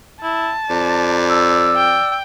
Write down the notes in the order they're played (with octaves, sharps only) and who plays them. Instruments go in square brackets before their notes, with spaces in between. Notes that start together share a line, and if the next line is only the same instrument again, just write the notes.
[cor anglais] E4 [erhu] A5
[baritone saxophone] F2 [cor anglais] D5
[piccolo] E6
[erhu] G5